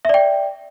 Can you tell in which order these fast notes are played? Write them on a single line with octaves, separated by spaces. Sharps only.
E5 D5 G5